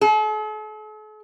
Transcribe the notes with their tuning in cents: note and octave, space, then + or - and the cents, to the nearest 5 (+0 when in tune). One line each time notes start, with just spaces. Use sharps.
A4 -45